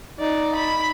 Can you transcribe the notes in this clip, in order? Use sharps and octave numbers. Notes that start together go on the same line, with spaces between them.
D#4 D5
B5